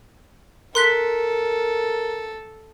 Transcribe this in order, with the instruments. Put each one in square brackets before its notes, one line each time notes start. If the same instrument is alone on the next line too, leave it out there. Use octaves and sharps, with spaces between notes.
[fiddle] A4 [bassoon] A#4 [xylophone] C6 F#6 B6